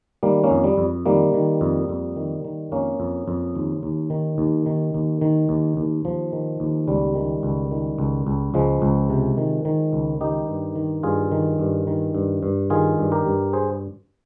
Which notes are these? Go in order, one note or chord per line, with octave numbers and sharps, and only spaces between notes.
D#3 G3 A#3
A#3 C#4
F2
G3
F2
D#3 G3 A#3
D#3
F2
F2
D#3
D#3
F2 A#3 C#4
F2
F2
D#2
D#2
D#3
D#2
D#3
D#2
D#3
D#2
D#2
D#2 F3
D#3
D#2
C#2 G3
D#3
C#2
D#3
C#2
C#2
C#2 F3 G#3
C#2
C3
D#3
D#3
C#2
D#3 D#4 G4
G2
D#3
G2 F4 G#4
D#3
G2
D#3
G2
G2
D#3 F4 G#4
G2
G4 A#4
G2
G#4 C5